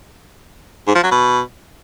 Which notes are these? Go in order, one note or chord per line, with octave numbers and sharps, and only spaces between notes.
G#2
F3
F#3
B2